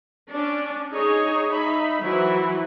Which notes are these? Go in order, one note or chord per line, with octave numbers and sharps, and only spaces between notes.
C#4 D4
D#4 G#4 C#5 D#5
D#4 E5 B5
E3 F#3 E4 B4 C5